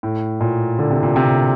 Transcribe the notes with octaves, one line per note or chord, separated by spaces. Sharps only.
A2
A#2
D3
C3
A#2
C3